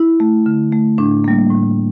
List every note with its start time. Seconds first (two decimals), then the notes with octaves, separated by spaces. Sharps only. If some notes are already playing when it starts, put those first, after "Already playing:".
Already playing: E4
0.20 A3
0.46 D3
0.72 A3
0.98 A2 D4
1.24 G3 A#3
1.51 A2